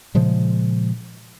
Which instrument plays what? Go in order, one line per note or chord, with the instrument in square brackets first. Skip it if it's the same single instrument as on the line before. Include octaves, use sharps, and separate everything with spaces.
[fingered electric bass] A#2 C#3 F3 G#3